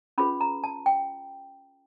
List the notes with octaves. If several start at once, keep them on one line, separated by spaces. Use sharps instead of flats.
C#4 F4 G#4 B4 B5
A#5
A5
G5